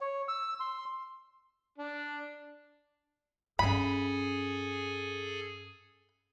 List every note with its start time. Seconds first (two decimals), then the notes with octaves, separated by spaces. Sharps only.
0.01 C#5
0.28 E6
0.60 C6
1.78 D4
3.59 G2 C#4 G#4 A4 G#5 B5